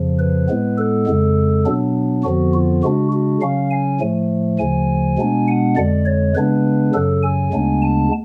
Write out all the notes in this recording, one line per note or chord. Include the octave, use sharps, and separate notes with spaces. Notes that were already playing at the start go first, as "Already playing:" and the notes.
Already playing: F2 C#3 F3
B4
A2 G#3 B3
A4
F2 C#3 G#3
B2 F#3 B3 D4
F2 D3 F3 B3 F#4
F4
C#3 G#3 D4 F#4
F#4
C#3 F#3 C#4 F5
G#5
A2 F3 A3
D2 C#3 F3 G#5
B2 G#3 B3 D4
F#5
F2 D3 G#3 D5
C#5
C#3 G#3 B3 D4 B4
F#2 C#3 F#3 A4
G#5
D2 C#3 G#3 B3 D4
A5